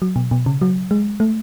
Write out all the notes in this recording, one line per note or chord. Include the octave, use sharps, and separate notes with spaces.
F#3
B2
B2
C#3
F#3
G#3
A3